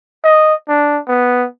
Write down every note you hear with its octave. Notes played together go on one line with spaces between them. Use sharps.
D#5
D4
B3